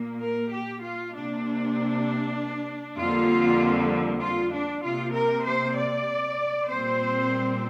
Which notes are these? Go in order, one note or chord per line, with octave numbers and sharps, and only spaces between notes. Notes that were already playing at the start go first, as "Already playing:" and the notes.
Already playing: A#2 A#3
A#4
G4
F4
C3 A#3 D4
F2 D3 G3 A#3 F4
F4
D4
C3 A#3 F4
A#4
C5
D5
A#2 G3 C4 C5